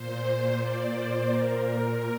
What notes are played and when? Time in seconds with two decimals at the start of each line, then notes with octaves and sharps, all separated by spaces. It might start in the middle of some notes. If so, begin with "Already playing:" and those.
Already playing: A#2 C5
0.25 C5
0.58 A#2 D5
0.93 C5
1.26 A#2 A#4
1.60 A#4